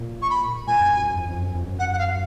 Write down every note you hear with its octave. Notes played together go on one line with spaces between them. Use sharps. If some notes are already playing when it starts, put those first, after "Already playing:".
Already playing: A#2
C#6
B5
A#2 G#5
F#2
F#2
F#2
F2
F2
F#2
F2
F#2
F#5
F#5
F5